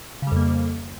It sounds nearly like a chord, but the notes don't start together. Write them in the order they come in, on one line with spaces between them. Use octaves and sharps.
C#3 G3 F2 A#3